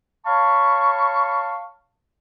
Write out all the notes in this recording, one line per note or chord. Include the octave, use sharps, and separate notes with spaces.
C#5 F5 A5 B5 C#6